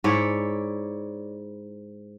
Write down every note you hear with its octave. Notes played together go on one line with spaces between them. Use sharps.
G#2 E4 C#5 D5